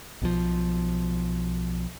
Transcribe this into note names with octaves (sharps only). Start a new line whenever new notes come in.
B1 B2 D#3 F3